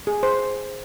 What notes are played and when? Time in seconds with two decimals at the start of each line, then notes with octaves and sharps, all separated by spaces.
0.07 G#4
0.23 C5